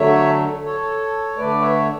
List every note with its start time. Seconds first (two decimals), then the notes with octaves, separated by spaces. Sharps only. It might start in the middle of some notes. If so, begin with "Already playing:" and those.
Already playing: D3 F#3 A3 C#5 E5
0.65 A4 C#5
1.37 D3 A3 B4 D5
1.61 C#5 E5